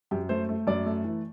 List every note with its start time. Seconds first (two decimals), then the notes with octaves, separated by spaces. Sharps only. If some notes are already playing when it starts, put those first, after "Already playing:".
0.11 F#2 G4
0.29 A3 C5
0.49 A3
0.67 F#2 D5
0.86 A3
1.04 E3